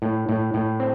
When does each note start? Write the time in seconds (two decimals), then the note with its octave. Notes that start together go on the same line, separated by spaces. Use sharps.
0.02 A2
0.29 A2
0.54 A2
0.80 C4